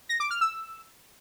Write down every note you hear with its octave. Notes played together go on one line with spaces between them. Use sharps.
A#6
D6
F6
E6